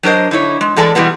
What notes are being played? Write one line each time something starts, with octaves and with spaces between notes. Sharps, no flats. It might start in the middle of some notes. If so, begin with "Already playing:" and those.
F#3 D4 A#4 C5 D#5
D3 D#4 E4 C#5
G#3
A2 E3 G#3 A4 D5 G#5
B2 E3 G3 G#3 B3